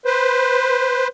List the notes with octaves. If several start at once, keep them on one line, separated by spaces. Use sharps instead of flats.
B4 C5